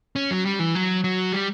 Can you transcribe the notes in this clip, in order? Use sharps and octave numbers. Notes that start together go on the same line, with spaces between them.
C#4
F#3
G3
E3
F#3
F#3
G3